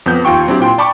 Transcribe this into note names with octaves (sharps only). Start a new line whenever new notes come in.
F2 B3 G6
D#2 F4 G5 C#6
F#3 C4 D4 E4 G4
A#2 G5 C6
D5 G5 A5 B5 C#6 D6